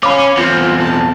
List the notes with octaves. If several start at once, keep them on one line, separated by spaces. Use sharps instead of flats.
C#4 F5 B5 D6
E2 C4 F4
A5